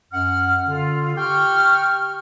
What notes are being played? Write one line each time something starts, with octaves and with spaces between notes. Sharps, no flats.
F#2 F#5 F6
D3 F4
G4 G5 C#6 F6